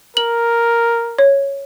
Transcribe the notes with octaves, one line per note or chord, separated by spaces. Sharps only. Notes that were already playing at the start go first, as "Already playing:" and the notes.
A#4 F#7
C#5